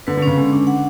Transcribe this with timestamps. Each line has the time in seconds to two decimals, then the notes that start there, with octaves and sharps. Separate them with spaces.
0.07 D3 B4
0.17 D3
0.22 C#3 C#4
0.37 D3 G#3
0.53 D4
0.67 F#5